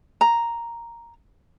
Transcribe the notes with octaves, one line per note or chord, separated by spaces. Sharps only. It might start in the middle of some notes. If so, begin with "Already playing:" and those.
A#5